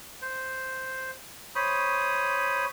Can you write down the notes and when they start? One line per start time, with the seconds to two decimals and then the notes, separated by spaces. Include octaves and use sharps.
0.22 C5
1.55 C5 C#5 B5 D#6